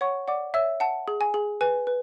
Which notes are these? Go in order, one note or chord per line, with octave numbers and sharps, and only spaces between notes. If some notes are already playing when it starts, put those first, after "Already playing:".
C#5 F#5 C#6
D5 F#5 D6
C#5 E5 E6
F#5 A5
G#4
G#5
G#4
B4 G#5
B4